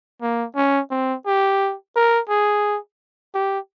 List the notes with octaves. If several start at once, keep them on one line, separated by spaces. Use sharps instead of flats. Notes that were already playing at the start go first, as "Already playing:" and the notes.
A#3
C#4
C4
G4
A#4
G#4
G4